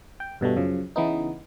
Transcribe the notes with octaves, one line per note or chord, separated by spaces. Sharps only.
G5
G2 B2 G3 A3
F#2 C#3 F3
C#3 E3 B3 D#4